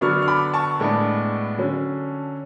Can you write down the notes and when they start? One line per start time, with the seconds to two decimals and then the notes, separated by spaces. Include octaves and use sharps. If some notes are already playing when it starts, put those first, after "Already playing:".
0.01 D3 F#3 B3 D4 C#6 F6
0.22 F6
0.27 B5 D6
0.54 A5 C#6
0.80 A2 G#3 B3 D4
1.58 D3 F#3 C#4